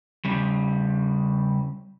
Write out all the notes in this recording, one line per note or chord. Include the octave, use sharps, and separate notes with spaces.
C#3 G3